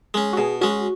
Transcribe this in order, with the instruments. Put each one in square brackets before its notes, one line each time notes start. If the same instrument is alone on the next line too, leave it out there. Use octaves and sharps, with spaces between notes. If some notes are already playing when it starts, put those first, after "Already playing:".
[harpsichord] G#3 C#4
[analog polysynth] F#4
[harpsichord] B2 [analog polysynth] G#4
[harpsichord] G#3 C#4 [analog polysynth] F#4